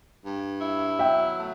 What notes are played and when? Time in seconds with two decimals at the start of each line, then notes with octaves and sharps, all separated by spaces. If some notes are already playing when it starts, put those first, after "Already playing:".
0.24 G2
0.61 E4
0.99 F#3 E5 G5
1.38 A3